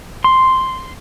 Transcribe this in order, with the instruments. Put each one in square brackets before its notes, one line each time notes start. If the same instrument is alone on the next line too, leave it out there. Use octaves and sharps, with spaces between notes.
[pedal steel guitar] C6